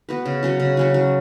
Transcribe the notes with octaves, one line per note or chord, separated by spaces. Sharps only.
B3 F#4 B4
C#3
F#3 C#4 F#4
C#3
F#3 C#4 F#4
F#3